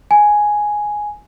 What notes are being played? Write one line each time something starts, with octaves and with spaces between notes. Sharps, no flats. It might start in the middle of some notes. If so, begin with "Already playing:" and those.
G#5